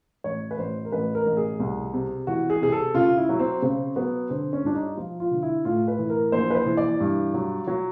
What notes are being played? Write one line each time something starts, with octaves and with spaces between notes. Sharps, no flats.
A1 C#5
B4
A1 C5
A#4
A1 B4
A#4
A1
G#4
C2
C3
E3 F#4
G#4
C3 G#4
A4
C#3 F4
E4
F#3
C4
C#3 C4
F#3 B3
D3 C4
C#4
G2 D4
D#4
F3 F4
F4
D3
E4
A2 F4
B4
E3
A#4
A#1 C5
B4
C5
E3
D5
G2
F#3
F#3